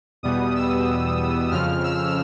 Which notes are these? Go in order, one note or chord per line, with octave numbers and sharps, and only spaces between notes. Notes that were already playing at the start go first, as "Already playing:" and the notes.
E2 B2 G3 B3 D#6
E6
F2 C#3 F3 F6
E6